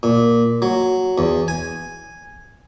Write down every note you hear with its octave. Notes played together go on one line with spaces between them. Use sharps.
A#2
F#3
E2
G#5